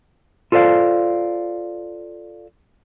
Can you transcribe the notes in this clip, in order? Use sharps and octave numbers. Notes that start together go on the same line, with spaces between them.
F4 A4 C5 D5 F5